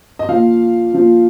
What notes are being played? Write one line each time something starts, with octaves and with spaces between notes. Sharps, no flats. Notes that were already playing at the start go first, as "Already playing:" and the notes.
D#5
A#2 F3 F5
A#2 F3